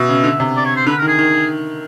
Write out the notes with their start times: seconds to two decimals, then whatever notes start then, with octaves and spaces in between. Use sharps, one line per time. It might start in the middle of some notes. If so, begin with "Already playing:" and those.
Already playing: B2 E5
0.09 C#3
0.24 D3
0.40 C3
0.56 D5
0.66 C#5
0.76 C5
0.87 D3 B4
0.98 A#4
1.02 D#3
1.08 G#4
1.19 D#3